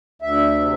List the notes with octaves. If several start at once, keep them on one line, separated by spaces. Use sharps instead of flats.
D2 E5
C3